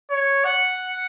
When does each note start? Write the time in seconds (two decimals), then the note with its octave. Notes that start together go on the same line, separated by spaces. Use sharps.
0.10 C#5
0.45 F#5